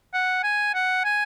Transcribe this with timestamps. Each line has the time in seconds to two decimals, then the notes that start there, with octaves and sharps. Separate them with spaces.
0.13 F#5
0.43 G#5
0.75 F#5
1.05 G#5